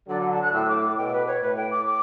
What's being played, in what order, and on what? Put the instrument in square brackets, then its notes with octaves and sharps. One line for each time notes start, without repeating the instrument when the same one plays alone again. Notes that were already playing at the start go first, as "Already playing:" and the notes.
[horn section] D3 F#3 [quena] D5
[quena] F#5
A5
F#6
[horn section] A2 [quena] E6
[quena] D6
D6
[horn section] B2 [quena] G5
[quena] A4
B4
C#5
[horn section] A2 [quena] B4
[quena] G5
D6
D6